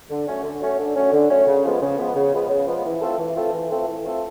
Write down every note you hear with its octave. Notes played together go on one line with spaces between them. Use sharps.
D3
F#3 A3 C#4
D3
F#3 A3 C#4
D3
F#3 A3 C#4
D3
F#3 A3 C#4
C#3
F3 G#3 B3
C#3
F3 G#3 B3
C#3
F3 G#3 B3
C#3
F3 G#3 B3
E3
A3 C4 F4 A4
E3
A3 C4 F4 A4
E3
A3 C4 F4 A4
E3
A3 C4 F4 A4